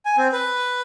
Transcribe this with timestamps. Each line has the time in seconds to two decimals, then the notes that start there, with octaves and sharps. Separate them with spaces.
0.05 G#5
0.18 C4
0.32 B4